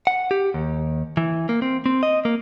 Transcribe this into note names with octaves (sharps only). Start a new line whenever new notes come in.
F#5
G4
D#2
E3
A#3
C4
C4
D#5
A#3